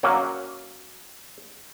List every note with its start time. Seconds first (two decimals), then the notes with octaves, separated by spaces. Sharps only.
0.03 F#3 A#3 C#4